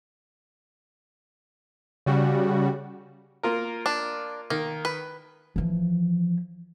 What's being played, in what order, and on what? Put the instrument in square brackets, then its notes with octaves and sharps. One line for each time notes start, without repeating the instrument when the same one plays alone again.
[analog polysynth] C#3 G3 F#4
[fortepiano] A#3 F4 A#4
[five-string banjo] D4
[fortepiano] D#3 [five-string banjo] A#3
[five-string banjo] B4
[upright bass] E3 F3